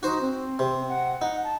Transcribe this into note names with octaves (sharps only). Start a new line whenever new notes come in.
D#4 F#4 C5
C4
C3
F#5
D#4 F#5
A5